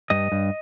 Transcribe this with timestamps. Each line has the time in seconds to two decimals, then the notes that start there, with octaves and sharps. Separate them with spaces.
0.10 G2 D#5
0.32 G2